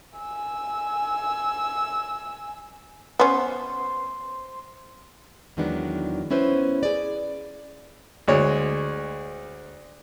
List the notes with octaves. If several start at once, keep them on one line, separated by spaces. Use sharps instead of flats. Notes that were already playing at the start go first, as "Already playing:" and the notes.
G#5 E6
B3 C#4 C5
E2 D#3 F#3 G#3 B3 D4
B3 C#4 E4 B4 C5
G#4 D5
D2 G#3 C#5